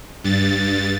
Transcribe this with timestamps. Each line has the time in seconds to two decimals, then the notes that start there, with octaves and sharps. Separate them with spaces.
0.24 G2 A6